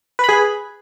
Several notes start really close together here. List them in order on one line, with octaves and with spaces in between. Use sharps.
B4 B5 G#4